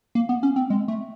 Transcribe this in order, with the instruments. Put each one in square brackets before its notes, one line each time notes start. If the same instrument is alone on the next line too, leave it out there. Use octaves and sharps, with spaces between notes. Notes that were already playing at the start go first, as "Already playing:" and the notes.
[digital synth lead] A#3
B3
C#4
C4
G#3
A3